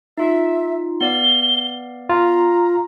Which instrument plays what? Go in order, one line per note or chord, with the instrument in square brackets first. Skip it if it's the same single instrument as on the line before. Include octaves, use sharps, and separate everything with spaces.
[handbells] D#4 F4 [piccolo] E5
[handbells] B3 D5 F5 [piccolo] G7
[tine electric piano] F4 [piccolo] A#5